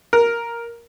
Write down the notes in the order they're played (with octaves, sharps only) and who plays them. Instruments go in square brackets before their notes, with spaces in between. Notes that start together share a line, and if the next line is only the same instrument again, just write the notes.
[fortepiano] A#4